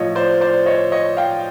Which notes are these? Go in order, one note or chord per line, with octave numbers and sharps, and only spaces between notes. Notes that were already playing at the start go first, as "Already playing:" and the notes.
Already playing: A2 F3 C#5 D#5
C5 D5
C5 D5
C#5 D#5
C#5 D#5
F5 G5